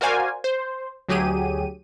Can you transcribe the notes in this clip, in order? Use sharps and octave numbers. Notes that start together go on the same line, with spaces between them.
F#4 A#4 C5 D5 F5 G#5
C5
D2 F#3 G4 G#4 D#7